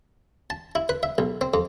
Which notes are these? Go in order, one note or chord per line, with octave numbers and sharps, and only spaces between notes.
A5
E4
B4
E5
B1
C4
F2